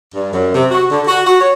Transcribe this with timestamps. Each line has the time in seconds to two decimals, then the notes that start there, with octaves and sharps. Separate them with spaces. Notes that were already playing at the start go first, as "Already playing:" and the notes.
0.14 G2
0.32 F#2
0.54 C3
0.70 F#4
0.91 D3
1.07 F#4
1.25 F#4
1.41 C#5